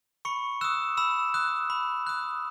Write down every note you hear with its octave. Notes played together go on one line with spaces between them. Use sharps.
B5 C#6 C#7
D#6 E6 F#6 E7
B5 E6 E7
D#6 F#6
B5
D#6 F#6